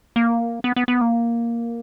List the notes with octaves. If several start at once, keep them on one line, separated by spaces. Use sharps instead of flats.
A#3
B3
B3
B3
A#3